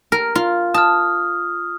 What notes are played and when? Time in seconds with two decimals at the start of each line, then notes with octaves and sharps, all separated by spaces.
0.12 A#4
0.35 F4
0.74 A5 D#6 F6